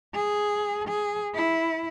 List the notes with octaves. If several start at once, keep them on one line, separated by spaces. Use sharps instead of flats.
G#4
G#4
E4